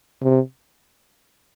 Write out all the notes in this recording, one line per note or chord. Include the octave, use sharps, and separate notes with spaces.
C3